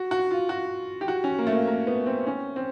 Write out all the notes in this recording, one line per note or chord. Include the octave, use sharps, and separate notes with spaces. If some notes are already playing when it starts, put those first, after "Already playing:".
Already playing: F#4
F#4
F4
F#4
G4
F#4
C#4
A#3
A3
A#3
A#3
B3
C4
C#4
C4